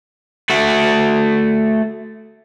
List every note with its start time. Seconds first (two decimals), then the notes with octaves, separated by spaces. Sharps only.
0.50 A3 F#4